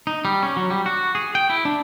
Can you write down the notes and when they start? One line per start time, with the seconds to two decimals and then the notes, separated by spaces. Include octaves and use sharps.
0.07 D#4
0.25 G3
0.43 C#4
0.57 F#3
0.70 G3
0.86 F#4
1.15 G#4
1.35 G5
1.50 E4
1.65 D4